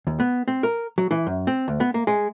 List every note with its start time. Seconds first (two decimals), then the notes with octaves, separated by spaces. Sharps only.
0.07 D#2
0.20 B3
0.48 C4
0.63 A#4
0.98 F#3
1.11 E3
1.26 F#2
1.47 C4
1.68 D2
1.80 B3
1.94 A#3
2.07 G#3